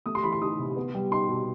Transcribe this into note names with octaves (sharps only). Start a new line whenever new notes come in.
A3 D#6
C6
E3 B5
C6
D#4 D#6
C3
B3
G3
D#4 C6
B2